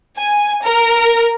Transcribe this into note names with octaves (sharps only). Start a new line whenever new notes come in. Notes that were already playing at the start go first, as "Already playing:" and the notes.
G#5
A#4